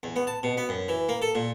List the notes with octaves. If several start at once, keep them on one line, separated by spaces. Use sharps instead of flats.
E2
B3
A5
B2
B3
F#2
E3
A#3
A4
A#2